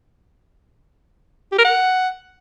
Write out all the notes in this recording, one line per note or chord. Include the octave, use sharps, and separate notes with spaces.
G4
A#4
F#5